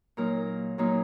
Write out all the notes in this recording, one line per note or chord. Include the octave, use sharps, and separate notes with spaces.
A#2 F#3 A#3 D#4 A#4
A#2 F#3 A#3 D#4